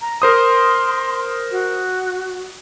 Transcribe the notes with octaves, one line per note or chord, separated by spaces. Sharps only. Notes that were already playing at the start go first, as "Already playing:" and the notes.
A#5
A#4 C5 C6 D#6
F#4